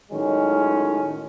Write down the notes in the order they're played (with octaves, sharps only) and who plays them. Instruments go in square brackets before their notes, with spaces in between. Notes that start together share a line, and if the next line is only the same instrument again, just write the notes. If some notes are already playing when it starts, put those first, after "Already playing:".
[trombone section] A2 D#3 F#3 G#3 C#4